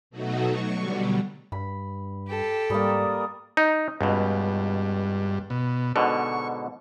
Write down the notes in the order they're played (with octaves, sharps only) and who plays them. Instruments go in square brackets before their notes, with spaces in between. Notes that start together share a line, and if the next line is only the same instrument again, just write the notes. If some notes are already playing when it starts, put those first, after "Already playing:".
[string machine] B2 F#3 A3 D#4 F#4
F#3 C#6
B2 D3 F#3 G3
[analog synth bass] G2 [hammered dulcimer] B5
[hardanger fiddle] G4 A4
[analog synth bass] G#2 [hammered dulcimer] G3 A#3 [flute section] A#4 D5 D#6
[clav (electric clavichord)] D#4
[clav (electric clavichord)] C#2 B2 [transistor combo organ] G2
[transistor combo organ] B2
[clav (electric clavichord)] G#2 B2 D3 [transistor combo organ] C#6